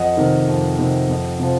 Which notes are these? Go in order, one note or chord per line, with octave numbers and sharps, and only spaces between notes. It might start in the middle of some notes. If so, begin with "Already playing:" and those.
Already playing: F2 D#5 F#5
C3 D#3
F2
C3 D#3
F2
C3 F3